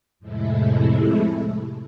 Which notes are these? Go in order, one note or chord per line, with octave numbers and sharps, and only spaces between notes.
F2 A2 C3 G#3 A3 E4